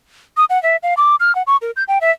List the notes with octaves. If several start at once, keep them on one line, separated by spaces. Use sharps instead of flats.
D#6
F#5
E5
F5
D6
F6
F#5
C#6
A#4
G6
G5
E5